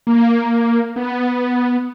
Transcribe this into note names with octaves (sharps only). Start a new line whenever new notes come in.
A#3
B3